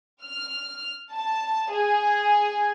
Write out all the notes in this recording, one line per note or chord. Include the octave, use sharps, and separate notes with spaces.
F6
A5
G#4